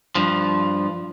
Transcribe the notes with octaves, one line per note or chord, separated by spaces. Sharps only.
G2 F3